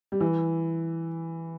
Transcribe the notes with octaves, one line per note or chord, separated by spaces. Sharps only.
G3
E3